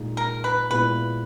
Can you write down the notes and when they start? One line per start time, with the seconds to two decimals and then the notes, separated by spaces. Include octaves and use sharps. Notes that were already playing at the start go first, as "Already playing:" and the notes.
Already playing: A#2 G#3 D#4
0.17 A#4
0.44 B4
0.71 A#2 G#3 B3 E4 B4